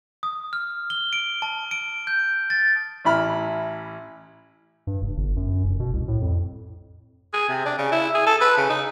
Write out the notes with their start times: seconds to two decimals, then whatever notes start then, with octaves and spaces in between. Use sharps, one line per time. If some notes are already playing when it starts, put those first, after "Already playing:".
0.23 D#6
0.53 F6
0.90 G7
1.13 D7
1.42 A5
1.71 D7
2.07 G6
2.50 A6
3.05 A1 E4 B5 F6
4.87 G2
5.02 F1
5.17 G1
5.36 F#2
5.64 F1
5.80 B2
5.93 C2
6.08 A2
6.22 F2
7.33 G#4
7.49 C3
7.65 D4
7.78 C#3
7.92 E4
8.15 G#4
8.27 A4
8.41 B4
8.57 C#3
8.69 D#4